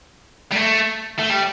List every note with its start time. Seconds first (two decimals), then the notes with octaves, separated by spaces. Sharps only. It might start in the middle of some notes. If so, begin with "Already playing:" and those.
0.52 G3
0.55 A3
1.19 A3
1.30 G3